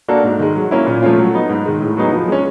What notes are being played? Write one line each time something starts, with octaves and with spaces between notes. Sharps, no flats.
A#3 D4 F#4 A4
G#2
D#3 G#3
F#3
A#3 C#4 E4
A#2
F3 A3 C#4 F4
F#3
B3 D#4
G#2
D#3 G#3
A2
F#3 B3 D#4 G#4
F3
G#3 C#4